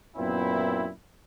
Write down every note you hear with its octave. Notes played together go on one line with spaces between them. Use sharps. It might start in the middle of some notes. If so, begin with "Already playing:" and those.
F#2 A#2 B3 C4 E4